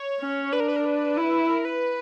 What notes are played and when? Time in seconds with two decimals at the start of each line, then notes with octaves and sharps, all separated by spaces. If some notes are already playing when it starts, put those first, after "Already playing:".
Already playing: C#5
0.21 C#4
0.53 D4 B4
0.60 A#4
0.68 B4
0.76 A#4
0.85 B4
1.17 E4
1.49 A#4
1.65 B4